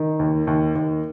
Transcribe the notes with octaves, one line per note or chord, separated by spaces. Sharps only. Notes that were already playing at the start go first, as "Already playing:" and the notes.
Already playing: D#3
D#2
D#2
D#2